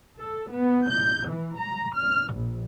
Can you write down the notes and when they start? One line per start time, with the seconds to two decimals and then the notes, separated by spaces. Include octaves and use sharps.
0.19 A4
0.52 B3
0.89 G6
1.29 E3
1.58 A#5
1.96 F6
2.34 A#1